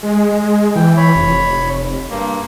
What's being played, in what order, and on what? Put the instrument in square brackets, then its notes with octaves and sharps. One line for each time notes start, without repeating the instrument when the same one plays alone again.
[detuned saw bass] G#3
[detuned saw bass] E3 [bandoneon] G5
[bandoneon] C#5 B5
[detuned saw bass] F1
[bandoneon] G2 A#3